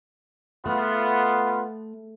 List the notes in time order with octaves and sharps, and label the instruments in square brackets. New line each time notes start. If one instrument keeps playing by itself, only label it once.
[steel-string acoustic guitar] A3 [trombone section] B3 F4